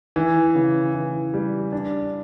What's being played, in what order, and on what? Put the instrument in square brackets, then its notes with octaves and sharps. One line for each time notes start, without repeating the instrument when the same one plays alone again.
[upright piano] E3
C#3
E3
G3
D4